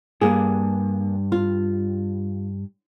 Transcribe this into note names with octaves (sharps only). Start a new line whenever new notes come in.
G2 A#3 G#4
F4